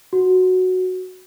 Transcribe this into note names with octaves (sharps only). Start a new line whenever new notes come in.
F#4